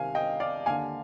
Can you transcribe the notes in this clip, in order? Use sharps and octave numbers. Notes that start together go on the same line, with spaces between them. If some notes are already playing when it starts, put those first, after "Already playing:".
Already playing: C2 C3 D#3 F5 G#5
D#5 G5
D5 F5
D#2 D3 F5 G#5